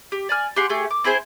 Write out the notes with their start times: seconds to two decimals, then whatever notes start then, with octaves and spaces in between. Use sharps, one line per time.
0.12 G4
0.29 D5 G#5 F6
0.56 G4 G#4 F#5 C6
0.69 A3 G4 G#4
0.90 D6
1.04 C4 E4 G#4 C5